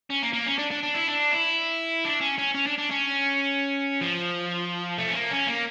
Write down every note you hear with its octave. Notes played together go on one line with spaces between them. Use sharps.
C#4
A#3
A#3
C#4
D4
D4
D4
E4
D4
E4
D4
C#4
C#4
C#4
D4
D4
C#4
F3
A3
C#4
A#3
C#4
A#3